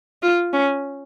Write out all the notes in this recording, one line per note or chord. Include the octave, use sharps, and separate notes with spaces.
F4
C#4